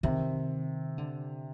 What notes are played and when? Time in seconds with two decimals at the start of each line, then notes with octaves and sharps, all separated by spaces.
0.03 C3 D#3
0.98 D3